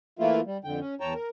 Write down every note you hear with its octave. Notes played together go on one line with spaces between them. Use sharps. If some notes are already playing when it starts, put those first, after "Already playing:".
E3 A3 A#3 E4 F4
G3
F2 D3 G5
C#4
E2 C#5 G5 A5 A#5
A#4